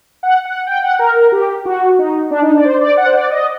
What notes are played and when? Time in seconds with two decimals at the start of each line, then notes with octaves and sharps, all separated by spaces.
0.23 F#5
0.45 F#5
0.67 G5
0.83 F#5
0.99 A#4
1.16 A#4
1.32 G4
1.66 F#4
1.99 D#4
2.31 D4
2.42 D#4
2.51 D4
2.57 D5
2.64 C5
2.81 D5
2.97 F#5
3.06 C5
3.14 D5
3.30 D#5